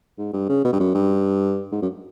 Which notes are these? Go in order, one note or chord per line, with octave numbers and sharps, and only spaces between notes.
G#2
G2
C#3
B2
G2
F#2
G2
G#2
F#2